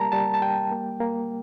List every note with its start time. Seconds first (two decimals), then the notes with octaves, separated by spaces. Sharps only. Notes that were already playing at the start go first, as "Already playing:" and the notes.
Already playing: G3 A#3 A#4 A5 A#5
0.12 G3 A5
0.34 A5
0.42 G3 G5
0.72 A#3
1.00 A#3